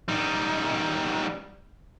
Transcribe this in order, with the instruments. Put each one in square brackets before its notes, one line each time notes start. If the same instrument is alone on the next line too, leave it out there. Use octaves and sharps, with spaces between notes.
[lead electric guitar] G3 D#4